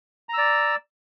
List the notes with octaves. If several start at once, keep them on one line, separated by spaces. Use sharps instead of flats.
D5 A#5 E6